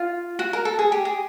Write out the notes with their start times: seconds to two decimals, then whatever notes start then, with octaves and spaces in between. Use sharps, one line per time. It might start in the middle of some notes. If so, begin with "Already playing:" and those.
Already playing: F4
0.39 F#4
0.53 A#4
0.65 A4
0.79 G#4
0.92 G4
1.05 G#4